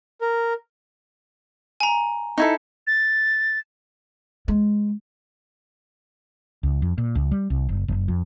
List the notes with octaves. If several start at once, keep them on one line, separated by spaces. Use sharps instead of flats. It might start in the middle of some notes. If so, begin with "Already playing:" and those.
A#4
G#5 A#5
D#4 E4 A4
A6
G#3
C#2
F2
A#2
C#2
G3
C2
F#1
F#1
F2